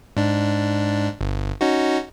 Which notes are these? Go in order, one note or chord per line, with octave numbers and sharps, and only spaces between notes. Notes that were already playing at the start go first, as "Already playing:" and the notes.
G#2 D4
G1
C#4 D#4 F#4